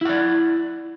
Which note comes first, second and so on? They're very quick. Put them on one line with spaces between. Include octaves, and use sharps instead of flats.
E4 F#5 D5